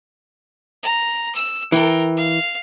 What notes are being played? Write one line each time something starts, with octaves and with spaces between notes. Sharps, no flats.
A#5
E6
E3 A#4 G5
F5